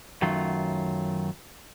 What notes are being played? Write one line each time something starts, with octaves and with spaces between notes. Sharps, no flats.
F#2 D#3 F#3 A3 F4